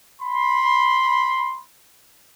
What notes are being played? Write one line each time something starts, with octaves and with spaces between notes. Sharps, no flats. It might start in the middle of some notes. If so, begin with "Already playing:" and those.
B5 C6